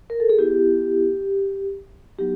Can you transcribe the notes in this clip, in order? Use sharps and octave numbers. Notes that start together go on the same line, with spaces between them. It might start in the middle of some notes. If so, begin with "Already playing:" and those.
A#4
A4
G#4
B3 E4 G4
F#3 B3 D#4 F#4 G4